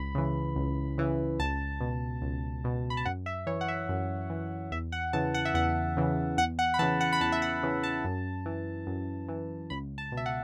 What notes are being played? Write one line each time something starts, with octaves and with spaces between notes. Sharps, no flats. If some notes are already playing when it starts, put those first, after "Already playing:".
Already playing: C#2 B5
C#3 E3
C#2
C#3 E3
C#2 A5
B2
C#2
B2
B5
A5
F#2 F#5
E5
E3 C#5
F#5
E5
F#2
E3
E2 E5
F#5
C#3 E3 A5
F#5
E5
E2 F#5
C#3 E3
E2 F#5
F#5
B5
C#3 E3 A5
F#5
B5
E2 A5
E5
F#5
C#3 E3
A5
F#2
E3
F#2
E3
C#2 B5
A5
B2
E5
F#5